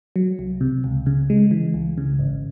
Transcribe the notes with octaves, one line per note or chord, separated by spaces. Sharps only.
F#3
C2
C3
C#2
C#3
G#3
E3
C#2
C#3
G#1